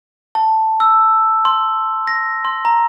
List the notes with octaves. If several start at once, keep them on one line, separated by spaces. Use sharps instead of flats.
A5
E6
C6
A#6
C6
A#5